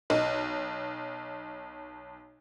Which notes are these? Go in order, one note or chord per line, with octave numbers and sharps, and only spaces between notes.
B1 D#4